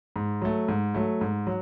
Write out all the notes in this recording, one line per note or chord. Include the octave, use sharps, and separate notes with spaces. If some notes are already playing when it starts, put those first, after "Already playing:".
G#2
F#3 A3
G#2
F#3 A3
G#2
F#3